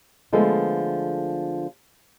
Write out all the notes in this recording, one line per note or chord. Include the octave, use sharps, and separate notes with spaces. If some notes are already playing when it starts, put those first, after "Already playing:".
D3 F3 G#3 A3 B3 A4